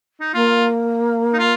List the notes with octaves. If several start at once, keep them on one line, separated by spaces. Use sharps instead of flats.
D#4
A#3 F4
D#4
F4